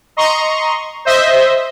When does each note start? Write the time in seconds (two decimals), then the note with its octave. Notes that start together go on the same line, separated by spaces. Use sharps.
0.17 D#5 A#5 C6 C#6
1.05 C5 D#5 E5